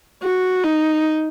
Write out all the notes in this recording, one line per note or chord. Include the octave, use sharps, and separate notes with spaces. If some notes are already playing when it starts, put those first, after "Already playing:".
F#4
D#4